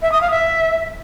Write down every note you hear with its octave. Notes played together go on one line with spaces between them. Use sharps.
E5
D#6
F5
E5